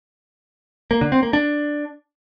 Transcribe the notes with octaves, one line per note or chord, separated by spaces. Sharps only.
A#3
D3
C4
A#3
D4